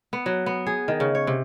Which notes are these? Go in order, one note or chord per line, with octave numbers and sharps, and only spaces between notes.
B3
F#3
B3
G#4
D#3
C#3
C#5
C3